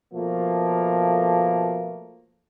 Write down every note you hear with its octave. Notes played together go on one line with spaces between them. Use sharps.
B2 F3 A3 A#3